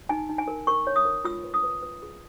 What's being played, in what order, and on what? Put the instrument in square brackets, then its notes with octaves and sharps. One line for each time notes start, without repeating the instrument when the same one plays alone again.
[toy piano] D#4 G#5
D#4
G#5
A#4
A#4 C#6
C#5
D#6
A#4
F4 E6
B4
D#6
B4
B4
G#4